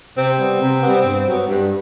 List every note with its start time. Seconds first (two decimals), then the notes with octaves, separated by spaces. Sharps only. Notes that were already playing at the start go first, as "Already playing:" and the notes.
0.17 C3 C4
0.38 G3 B3
0.61 C3
0.83 G3 B3
1.04 G2
1.26 F#3 B3
1.47 G2